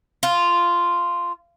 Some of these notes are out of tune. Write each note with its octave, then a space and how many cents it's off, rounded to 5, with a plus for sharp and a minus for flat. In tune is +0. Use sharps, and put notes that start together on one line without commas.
F4 -5